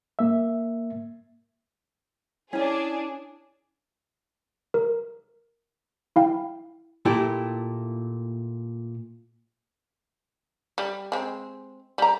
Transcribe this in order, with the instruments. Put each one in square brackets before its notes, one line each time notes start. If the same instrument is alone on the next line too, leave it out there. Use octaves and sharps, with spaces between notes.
[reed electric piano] A#3 E5
[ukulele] C#4 A5 [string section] D4 G#4 [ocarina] E4
[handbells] A#4
E4 F5 G5
[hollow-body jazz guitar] A#2 A3 E4 G4
[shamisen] G3
G#3 C4
G3 A#5